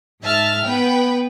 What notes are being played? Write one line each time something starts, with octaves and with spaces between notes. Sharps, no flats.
G#2 E5 A5 F6
B3 B4 G5